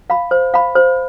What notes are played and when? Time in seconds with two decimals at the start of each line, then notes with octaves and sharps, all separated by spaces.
0.10 F5 B5
0.31 C5
0.54 F5 B5
0.75 C5